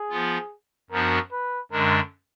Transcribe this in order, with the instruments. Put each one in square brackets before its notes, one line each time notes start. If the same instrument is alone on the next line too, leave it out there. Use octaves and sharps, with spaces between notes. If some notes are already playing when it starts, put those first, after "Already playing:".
Already playing: [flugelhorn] G#4
[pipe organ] F3 B3 F4
[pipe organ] F#2 F3 B3 D4 F#4 [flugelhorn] A#4
[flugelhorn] B4
[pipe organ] F#2 D3 G#3 D4 [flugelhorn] A#4